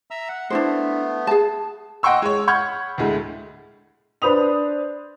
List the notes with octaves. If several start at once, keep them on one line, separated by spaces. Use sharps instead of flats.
E5 A#5 E6
F#5
A3 B3 D4 E4 C5
G#4 A5
D#5 F#5 G5 C6 C#6 E6
G#3 C#5
F#5 B5 C#6 F6 G6 G#6
D2 A2 G#3 A3
D4 B4 C5 B5 D#6 F7